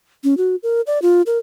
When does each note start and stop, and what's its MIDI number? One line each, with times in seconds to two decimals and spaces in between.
0.24 0.37 61
0.37 0.56 66
0.63 0.81 70
0.87 1.01 74
1.02 1.22 65
1.26 1.38 70